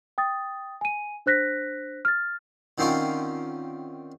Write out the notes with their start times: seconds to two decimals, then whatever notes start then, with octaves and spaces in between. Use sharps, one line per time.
0.18 G5 D#6 A6
0.81 G#5 D#7
1.26 D4 C5 F#6 A#6 B6
2.05 F6 A6
2.78 D3 D#3 C4 C#4 F4 A#4